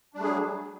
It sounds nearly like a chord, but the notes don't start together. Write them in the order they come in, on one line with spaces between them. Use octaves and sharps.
D4 G3 A3 G#4 F#3